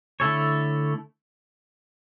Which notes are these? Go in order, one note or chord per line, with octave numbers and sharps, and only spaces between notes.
D3 A3 E4 A4 C#5